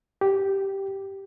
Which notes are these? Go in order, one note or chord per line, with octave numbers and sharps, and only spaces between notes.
G4